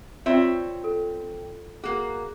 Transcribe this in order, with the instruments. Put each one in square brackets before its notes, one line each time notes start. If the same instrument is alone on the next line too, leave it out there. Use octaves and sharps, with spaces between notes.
[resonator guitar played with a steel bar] C4 C#5 E5 [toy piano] F4 D5
[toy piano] A4
[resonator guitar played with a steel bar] A#3 F#4 [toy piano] G#4